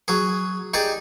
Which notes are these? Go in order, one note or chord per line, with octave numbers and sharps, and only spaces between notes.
F#3 G#4
D#4 G4 G#4 D5